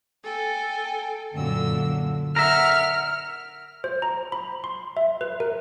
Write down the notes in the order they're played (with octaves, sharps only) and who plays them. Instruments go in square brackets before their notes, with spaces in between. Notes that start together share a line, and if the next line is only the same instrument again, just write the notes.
[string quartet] A4 G5 G#5
[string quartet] F#2 A#2 E6 [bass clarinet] D3
[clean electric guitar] A#4 E5 [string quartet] F#5 [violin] F6
[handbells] C5
A#5
B5
C6
E5
B4
A#4